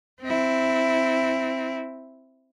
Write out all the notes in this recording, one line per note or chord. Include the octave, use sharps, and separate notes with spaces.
C4 E4